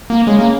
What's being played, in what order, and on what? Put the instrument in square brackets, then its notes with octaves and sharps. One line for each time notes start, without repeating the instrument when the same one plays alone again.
[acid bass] A#3
[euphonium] C#3 [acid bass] G#3
[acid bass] A#3